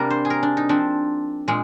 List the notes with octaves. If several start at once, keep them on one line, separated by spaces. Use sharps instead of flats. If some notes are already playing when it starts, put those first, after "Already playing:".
Already playing: C3 G3 A#3 D4 A#4
C5
G#4
A#4
D4
D#4
F3 C4 D4
A#2 G#3